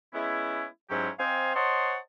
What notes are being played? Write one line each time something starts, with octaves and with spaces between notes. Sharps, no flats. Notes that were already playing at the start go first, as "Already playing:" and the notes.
G#3 B3 C#4 E4
G#2 F#3 G#3 C#4 E4 G4
C4 C5 D#5 F5 G5 G#5
C5 C#5 D#5 F#5 A5 C6